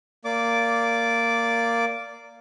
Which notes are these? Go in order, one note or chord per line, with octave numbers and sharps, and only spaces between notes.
A#3 D5 D6